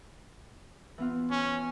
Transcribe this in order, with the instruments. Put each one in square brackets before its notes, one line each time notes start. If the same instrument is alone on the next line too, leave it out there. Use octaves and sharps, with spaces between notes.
[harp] E3 B3 F4
[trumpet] C#4